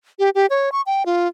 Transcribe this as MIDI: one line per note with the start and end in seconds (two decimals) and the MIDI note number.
0.19 0.30 67
0.35 0.46 67
0.50 0.72 73
0.72 0.81 85
0.86 1.06 79
1.06 1.28 65